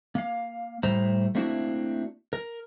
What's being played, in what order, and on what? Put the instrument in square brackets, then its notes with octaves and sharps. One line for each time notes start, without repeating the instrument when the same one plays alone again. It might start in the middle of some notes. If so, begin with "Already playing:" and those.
[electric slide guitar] A#3 F5
A2 G3 A3 C5 A#5
A3 A#3 C4 D4 E4 F#4
A#4